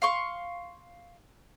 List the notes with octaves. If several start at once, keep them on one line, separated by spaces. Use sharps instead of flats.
F5 C6 C#6